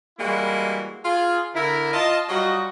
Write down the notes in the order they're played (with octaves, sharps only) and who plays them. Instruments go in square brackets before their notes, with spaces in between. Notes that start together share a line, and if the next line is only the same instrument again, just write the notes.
[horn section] E3 G3 G#3 A#3 E4 F#4
F4 G#4
D3 E4 A#4
F4 D#5 A5
F#3 G3 F4 F#4 D#5